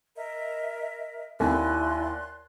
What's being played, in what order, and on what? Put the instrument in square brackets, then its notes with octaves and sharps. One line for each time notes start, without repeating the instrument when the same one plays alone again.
[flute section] A#4 D#5 E5
[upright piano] D#2 G#5 [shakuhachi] E4 [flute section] D5 C6 F#6